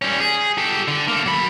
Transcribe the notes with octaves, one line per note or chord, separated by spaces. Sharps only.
G3 C#4
G#4
G4 A4
D3
A#3 A4
F#3 B5